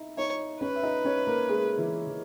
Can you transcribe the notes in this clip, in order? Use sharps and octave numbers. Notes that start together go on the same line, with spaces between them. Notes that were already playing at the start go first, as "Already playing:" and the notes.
Already playing: D#4 E4 D#5 E5
D#4 C#5 D#5
C#4 B4 C#5
E5
D#4 D#5
C#4 C#5
A#3 A#4
G#3 G#4
E3 E4
E3 E4